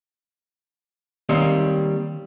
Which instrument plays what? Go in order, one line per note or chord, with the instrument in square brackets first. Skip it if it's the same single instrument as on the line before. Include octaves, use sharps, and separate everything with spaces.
[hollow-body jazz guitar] D#3 G3 A#3 C4 C#5